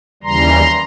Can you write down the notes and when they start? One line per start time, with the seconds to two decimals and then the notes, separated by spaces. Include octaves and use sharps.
0.23 D#2 C#3 E3 G3 A#5 C6